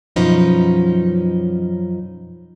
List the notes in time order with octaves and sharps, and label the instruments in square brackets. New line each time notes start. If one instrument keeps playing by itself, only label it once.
[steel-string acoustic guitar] F#2 B2 F3 C#4 D#4 B4